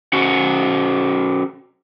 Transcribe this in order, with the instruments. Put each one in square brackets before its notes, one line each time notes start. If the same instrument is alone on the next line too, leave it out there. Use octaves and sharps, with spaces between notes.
[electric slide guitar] C#4 F#4 C5 F#5